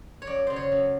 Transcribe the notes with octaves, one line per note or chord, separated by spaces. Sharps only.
C#5
F#2 D5
C#3 C5
C#5
F#2